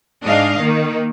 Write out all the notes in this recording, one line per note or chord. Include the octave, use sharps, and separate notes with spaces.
G#2 D4 D#5 F5
D#3 A#3